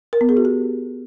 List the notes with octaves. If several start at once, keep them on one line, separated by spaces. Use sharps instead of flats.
A#4
B3
G#4
F#4
G4